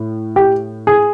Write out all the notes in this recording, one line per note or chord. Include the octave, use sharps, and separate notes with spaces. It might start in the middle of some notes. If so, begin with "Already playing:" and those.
Already playing: A2
G4
G#4